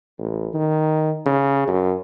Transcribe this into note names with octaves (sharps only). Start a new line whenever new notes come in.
A1
D#3
C#3
F#2